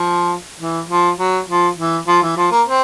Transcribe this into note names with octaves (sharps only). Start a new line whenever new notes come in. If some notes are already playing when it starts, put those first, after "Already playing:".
Already playing: F3
E3
F3
F#3
F3
E3
F3
E3
F3
A#3
C4